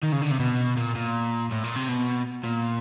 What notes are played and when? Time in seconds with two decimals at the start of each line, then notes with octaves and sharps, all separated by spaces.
0.03 D#3
0.12 C#3
0.21 D3
0.31 C3
0.40 B2
0.77 A#2
0.96 A#2
1.51 A2
1.63 A#2
1.76 C3
1.89 B2
2.44 A#2